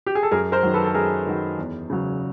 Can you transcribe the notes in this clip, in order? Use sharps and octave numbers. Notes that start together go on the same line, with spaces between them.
G4
G#4
A4
F#2 G#4 A#4
A#4 C5
D#3 F#3
A4 B4
A4
F#2 G#4 A#4
D#3 F#3
E2
C#3 F#3